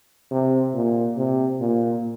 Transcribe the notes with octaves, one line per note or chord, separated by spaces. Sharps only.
C3
A#2
C3
A#2